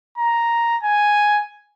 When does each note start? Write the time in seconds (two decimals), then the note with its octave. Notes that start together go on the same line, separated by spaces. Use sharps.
0.18 A#5
0.83 G#5